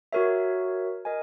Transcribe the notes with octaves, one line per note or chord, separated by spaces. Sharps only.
F#4 A#4 C#5 E5
A#4 D#5 G#5